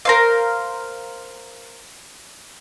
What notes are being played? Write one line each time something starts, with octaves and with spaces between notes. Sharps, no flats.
A#4 C5 F5